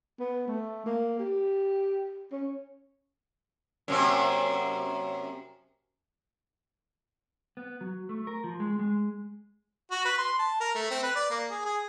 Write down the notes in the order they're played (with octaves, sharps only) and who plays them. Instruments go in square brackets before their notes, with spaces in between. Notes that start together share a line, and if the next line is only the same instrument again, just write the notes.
[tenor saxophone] B3
A3
A#3
G4
C#4
[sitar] F#2 C3 A#3
[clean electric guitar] B3
F#3
A3
A#4
F3
G#3
G#3
[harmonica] F#4
B4
C6
A5
A#4
A3
C4
B4
D5
A#3
G#4
G#4